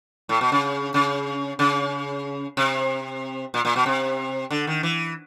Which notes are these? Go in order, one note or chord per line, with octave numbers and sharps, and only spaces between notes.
A2
B2
C#3
C#3
C#3
C3
A#2
A#2
B2
C3
D3
D#3
E3